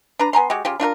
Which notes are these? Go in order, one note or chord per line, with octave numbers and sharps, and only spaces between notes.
D4 B4 A#5
B3 G#5 A#5 C6
G#3 F#4 G4
C#3 F4 G4
D4 F4 F#4 A#4